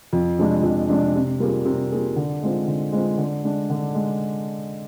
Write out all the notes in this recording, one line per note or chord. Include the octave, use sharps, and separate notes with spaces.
F2
C3 F3 G#3 D4
F2
C3 F3 G#3 D4
C3
G3 A#3 F4 G#4
C3
G3 A#3 F4 G#4
D3
G#3 C4 F4
D3
G#3 C4 F4
D3
G#3 D4
D3
G#3